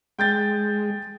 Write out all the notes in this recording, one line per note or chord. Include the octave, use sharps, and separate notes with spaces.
G#3 G5 G6 A6